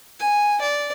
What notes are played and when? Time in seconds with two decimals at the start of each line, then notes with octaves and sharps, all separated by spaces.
0.20 G#5
0.61 D5